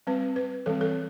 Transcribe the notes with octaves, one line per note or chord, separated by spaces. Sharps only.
G3 C4 B4
B4
E3 G3 C4 A4
A4